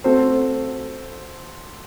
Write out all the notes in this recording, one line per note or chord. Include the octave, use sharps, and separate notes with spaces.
A3 C4 F#4 A4 C5